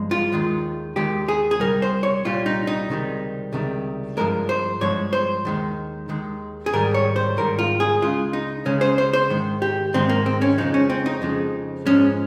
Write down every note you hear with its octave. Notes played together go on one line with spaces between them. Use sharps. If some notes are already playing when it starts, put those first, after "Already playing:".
Already playing: G2 F3 G#3
F4
D#2 D#3 G#3
D#2 D#3 G#3 G4
G#4
G#4
C2 A#2 G3 A#4
C5
C#5
C2 A#2 G3 F4
D#4
D#4
C#2 C3 D#3 G3
C#2 C3 D#3 G3
G2 F3 G#3 A#4
C5
G2 F3 G#3 C#5
C5
D#2 D#3 G#3
D#2 D#3 G#3
G#4
G#2 D#3 G3 A#4
C#5
C5
G#2 D#3 G3 A#4
F4
G#4
C#2 C#3 G#3 F4
D#4
C#2 C#3 G#3 C#4
C5
C5
C5
G#2 D#3 G#3
G4
G#2 D#3 G#3 C4
A#3
C4
C#4
F2 C#3 F3 G#3 D#4
C#4
C4
D#4
F2 C#3 F3 G#3
G#2 F3 G#3 C#4